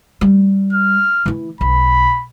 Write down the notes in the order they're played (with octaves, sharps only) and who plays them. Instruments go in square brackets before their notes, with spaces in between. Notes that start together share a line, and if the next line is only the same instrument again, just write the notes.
[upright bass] G3
[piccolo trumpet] F6
[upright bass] E3 E4
[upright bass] B1 [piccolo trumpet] B5